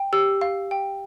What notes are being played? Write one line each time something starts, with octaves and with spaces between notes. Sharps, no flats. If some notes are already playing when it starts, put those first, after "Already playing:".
Already playing: G5
G4 E6
F5
G5